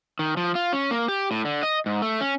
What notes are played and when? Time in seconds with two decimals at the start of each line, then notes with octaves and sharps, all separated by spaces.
0.19 D#3
0.37 F3
0.55 F4
0.73 C#4
0.91 A#3
1.08 G4
1.31 A2
1.45 D3
1.63 D#5
1.86 G#2
2.02 A3
2.21 C#4